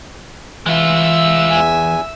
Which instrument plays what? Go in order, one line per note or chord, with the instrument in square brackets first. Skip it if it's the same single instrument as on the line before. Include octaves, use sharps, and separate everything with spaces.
[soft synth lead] E3 [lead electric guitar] G#3 F4 [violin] E5 E6
[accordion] E2 G#5